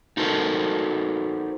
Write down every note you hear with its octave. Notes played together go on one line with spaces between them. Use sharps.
D#4 F#4 A4 A#4 C5